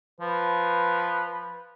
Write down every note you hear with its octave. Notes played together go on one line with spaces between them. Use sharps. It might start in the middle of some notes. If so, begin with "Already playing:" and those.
F3 B4